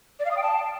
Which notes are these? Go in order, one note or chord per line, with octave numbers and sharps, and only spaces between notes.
D5
F5
D#6
G5
A5